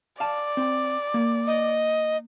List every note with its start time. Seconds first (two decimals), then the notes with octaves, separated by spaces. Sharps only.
0.20 D5 F5 A5
0.57 C4
1.14 A#3
1.47 D#5